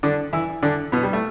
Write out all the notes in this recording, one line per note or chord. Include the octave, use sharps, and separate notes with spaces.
D3 D4
E3 E4
D3 D4
B2 B3
G3
A3